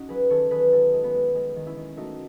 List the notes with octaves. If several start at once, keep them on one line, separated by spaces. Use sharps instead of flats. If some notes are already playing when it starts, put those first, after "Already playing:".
Already playing: C#4 D#4 F#4
F#3 G#4 B4
D#3 A4 C#5
D#3 G#4 B4
G#3 F#4 A4
G#3
B3
G#3
G#3
D#3
C#4 E4
D#3
A3 D#4 F#4